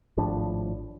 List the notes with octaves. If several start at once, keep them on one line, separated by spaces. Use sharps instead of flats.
G#1 A2 F3 D4